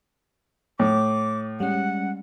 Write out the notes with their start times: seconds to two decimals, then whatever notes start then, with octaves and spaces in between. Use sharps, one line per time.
0.80 A2 D6
1.60 G3 G#3 C#4 F#5